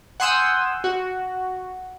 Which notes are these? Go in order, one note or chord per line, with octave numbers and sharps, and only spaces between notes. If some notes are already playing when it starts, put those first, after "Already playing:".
F#5 G#5 C6 D#6 E6 G6
F#4